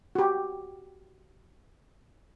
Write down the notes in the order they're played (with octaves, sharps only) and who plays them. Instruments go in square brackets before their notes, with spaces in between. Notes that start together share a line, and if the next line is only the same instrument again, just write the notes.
[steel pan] F#4 G4